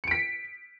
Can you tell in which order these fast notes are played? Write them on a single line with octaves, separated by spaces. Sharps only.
C#7 D7 B6